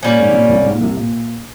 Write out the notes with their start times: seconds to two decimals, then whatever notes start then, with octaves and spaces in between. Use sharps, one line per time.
0.03 A#2 G3 A#3 C#4
0.19 G#2
0.29 C3
0.34 A#2
0.49 C2 C3
0.63 G#2
0.72 A#2
0.80 C2 C3
0.97 A#2